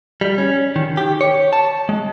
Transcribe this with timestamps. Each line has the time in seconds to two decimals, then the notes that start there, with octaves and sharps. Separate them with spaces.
0.21 G3
0.38 C#4
0.76 D#3
0.97 G4
1.21 C#5
1.53 A5
1.89 G#3